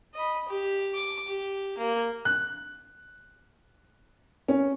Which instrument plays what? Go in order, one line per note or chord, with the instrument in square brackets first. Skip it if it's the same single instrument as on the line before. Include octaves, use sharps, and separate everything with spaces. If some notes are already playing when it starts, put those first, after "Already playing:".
[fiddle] D#5 B5
G4
D6
G4
A#3
[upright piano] F#6
C#4